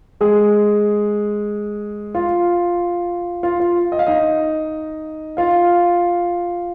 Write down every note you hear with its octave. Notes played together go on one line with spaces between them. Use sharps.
G#3 G#4
F4
F4
F4
D#5
F5
D#4 D#5
F4 F5